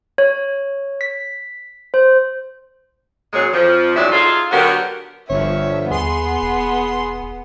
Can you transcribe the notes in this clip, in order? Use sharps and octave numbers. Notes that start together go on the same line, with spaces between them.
C#5
B6
C5
F#2 A#2 F#3 G#3 G#4 C#5
F2 F3
E2 G2 F#3 G#3 D5 E5
D#4 F4 G#4 A4 F5
D3 F#3 B3 F#4 G4 A#4
G1 F3 C#5 E5
D#2 B3 G#4 C6
E1